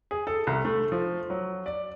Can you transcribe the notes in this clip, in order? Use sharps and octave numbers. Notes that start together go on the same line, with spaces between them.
G#4
A4
C2
A3
F3
F#3
D5